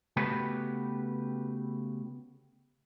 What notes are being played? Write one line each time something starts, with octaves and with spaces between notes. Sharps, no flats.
C#3 A3 B3 F#4 G4 B4